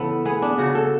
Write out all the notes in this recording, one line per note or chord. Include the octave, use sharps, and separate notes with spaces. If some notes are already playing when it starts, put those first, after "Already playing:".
Already playing: C#3 E3 B3 A4
B3 G#4
D4
C#3 F#4
A4